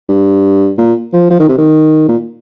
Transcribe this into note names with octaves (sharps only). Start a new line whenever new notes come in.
G2
A#2
F3
F3
D#3
C3
D#3
A#2